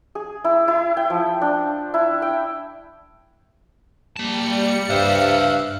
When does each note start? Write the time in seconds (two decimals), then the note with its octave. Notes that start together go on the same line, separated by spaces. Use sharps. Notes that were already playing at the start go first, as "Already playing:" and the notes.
0.15 G#4
0.44 E4
0.68 E4
0.97 G5
1.10 F3
1.41 D4
1.94 E4
2.22 G5
4.17 G3 A#3 A5 C#7
4.90 C#2 G2 C5 E5 F5 F#6